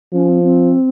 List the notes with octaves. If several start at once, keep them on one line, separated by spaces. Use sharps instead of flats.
F3 C#4
C4
C4